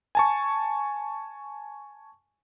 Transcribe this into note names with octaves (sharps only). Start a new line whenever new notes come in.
G#5 A5 C#6